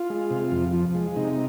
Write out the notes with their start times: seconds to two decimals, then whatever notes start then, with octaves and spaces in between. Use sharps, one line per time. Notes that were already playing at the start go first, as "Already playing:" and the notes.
Already playing: F4
0.10 G#3
0.31 C3
0.51 F2
0.73 F3
0.95 G#3
1.16 C3 D#4